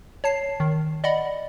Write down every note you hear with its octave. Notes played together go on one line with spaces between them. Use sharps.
C#5 A5 C7
D#3
D5 D#5 F#5 B5